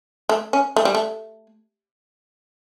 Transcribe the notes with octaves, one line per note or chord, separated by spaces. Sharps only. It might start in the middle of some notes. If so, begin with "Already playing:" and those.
A3
C#4
A3
G3
A3